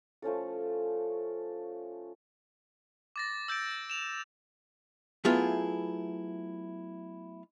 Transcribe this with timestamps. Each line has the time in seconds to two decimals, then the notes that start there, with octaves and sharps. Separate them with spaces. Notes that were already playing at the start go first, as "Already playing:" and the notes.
0.22 F3 A3 C#4 A4
3.16 D6 A6 A#6
3.48 E6 G6 A6 D7
3.90 E7 F7
5.25 F#3 A3 B3 E4 F4 G#4